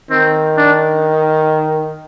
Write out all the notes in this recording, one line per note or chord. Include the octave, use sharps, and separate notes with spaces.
D#3 C4
D4